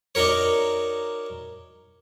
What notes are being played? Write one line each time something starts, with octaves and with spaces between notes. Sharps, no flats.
D4 D#4 F#4 A#4 C#5